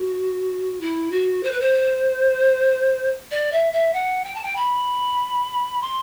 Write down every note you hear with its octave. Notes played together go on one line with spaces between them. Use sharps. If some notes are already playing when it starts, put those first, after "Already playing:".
Already playing: F#4
E4
F#4
C5
B4
C5
D5
E5
E5
F#5
G5
A5
G5
B5
C6